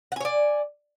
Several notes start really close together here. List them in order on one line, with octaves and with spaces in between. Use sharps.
F#5 G#5 C#5 D5